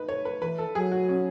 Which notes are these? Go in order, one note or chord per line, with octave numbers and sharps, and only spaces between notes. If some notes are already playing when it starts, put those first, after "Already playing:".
Already playing: D#4 B4
C#5
B4
E3 B4
A4
F#3 G#4
F#4
C#4